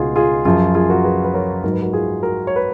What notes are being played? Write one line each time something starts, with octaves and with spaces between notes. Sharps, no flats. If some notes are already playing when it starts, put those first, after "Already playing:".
Already playing: C#2 B2 D#4 F4 F#4 G#4
F4 G#4
F#2 F3 F4 G#4
F4 G#4
F#4 A#4
G#4 B4
B4
A#4 C#5
G#2 F#3 A#4
B4
F#4 A#4
F4 G#4
F#4 A#4
C#5
B4